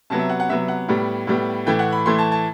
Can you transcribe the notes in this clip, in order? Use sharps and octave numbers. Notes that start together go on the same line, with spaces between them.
C3 F#3 B3 A5
E5
F#5
F#5
C3 F#3 B3 E5
F#5
A2 G3 B3
A2 G3 B3
A2 E3 A3 G5
F#5
B5
A2 E3 A3 C6
A5
A5